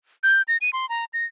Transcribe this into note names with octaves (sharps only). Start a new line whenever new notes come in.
G6
A#6
D#7
C6
A#5
A#6